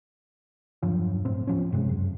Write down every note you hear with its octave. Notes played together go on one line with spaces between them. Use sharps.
E1 G2 F3 F#3
A2 C4
D1 F3 C#4
G2 C3 G#3
F#2